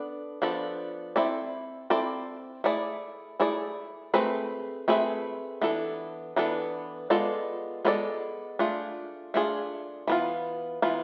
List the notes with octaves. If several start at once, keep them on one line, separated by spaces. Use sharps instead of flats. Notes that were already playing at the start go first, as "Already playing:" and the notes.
Already playing: B3 D4 A4
F3 B3 D4 A4
C4 E4 A4 D5
C4 E4 A4 D5
A3 E4 G#4 D5
A3 E4 G#4 D5
A3 C4 G#4 B4 E5
A3 C4 G#4 B4 E5
E3 B3 D4 A4
E3 B3 D4 A4
G#3 B3 F4 A4 D5
G#3 B3 F4 A4 D5
A3 D4 F4 G#4
A3 D4 F4 G#4
E3 B3 F4
E3 B3 F4